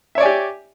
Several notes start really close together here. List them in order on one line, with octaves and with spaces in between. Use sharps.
E5 C#5 D5 G#5 G4